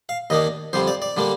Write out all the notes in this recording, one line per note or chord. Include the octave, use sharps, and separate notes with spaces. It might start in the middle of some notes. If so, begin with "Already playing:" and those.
F5
D#2 D#3 A#3 D4 D#5
F2 D3 G3 C5
D5
D5
D3 G3 A#3 D4